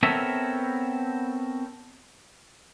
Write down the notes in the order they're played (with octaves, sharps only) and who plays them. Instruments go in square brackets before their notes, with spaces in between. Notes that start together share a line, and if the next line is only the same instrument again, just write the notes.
[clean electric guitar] B3 C4 A4 A#4 C#5 E5